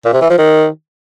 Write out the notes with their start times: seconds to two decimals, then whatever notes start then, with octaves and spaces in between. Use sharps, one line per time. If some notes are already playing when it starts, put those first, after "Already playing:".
0.05 A#2
0.13 C3
0.22 E3
0.30 F3
0.38 D#3